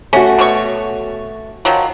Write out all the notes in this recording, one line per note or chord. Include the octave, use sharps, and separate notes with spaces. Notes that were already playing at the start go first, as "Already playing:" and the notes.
A3 C#4 F#4
B2 C#5 C#6
D#3 F3 F#3